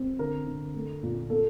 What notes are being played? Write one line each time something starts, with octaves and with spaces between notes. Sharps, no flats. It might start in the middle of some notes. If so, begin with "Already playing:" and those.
Already playing: C4
D3 A#4
D3
A3
A#2
A#3 A4